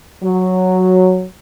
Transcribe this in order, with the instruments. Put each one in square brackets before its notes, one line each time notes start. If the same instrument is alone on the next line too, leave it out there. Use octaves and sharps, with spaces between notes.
[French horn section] F#3